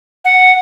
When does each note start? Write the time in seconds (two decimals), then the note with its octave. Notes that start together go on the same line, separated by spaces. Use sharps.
0.25 F#5